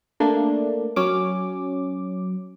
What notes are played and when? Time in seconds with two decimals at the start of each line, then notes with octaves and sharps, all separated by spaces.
0.20 A3 A#3 D4
0.96 F#3 C#4 D6